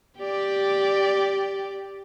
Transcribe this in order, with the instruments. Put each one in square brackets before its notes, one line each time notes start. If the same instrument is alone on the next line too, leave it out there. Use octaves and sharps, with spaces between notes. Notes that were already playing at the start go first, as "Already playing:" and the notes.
[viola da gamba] G4 D5